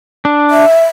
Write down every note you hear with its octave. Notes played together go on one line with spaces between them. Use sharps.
D4
E5